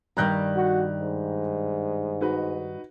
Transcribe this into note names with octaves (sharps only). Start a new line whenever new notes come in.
G2 D#3 G3 A#5 F#6 G6
F#4
G#2
D#4 F#4 B4